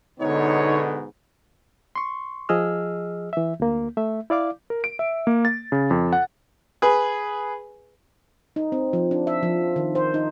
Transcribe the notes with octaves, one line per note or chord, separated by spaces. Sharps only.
G#2 B2 D3 B3 D#4 C#5
C6 C#6
F3 G#4 D#5 E6 F6
E3 E5
D2 A#3
A3 E5
E4 D5 F5 D6
A#4
D7
E5
A#3
A6
C#3
F2
F#5
G#4 B4
D#4
C4
F3
D4
E5
F3
D#3
C5
D#4